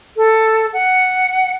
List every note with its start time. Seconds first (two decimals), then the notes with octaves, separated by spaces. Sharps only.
0.17 A4
0.73 F#5